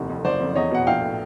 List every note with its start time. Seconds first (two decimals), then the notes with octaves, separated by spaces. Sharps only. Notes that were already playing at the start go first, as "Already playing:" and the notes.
Already playing: F1 D#2
0.09 F2
0.25 F#1 C5 D5
0.41 F2
0.55 E2 C#5 D#5
0.71 B2 F#5
0.87 A#1 F5 G5
1.02 A2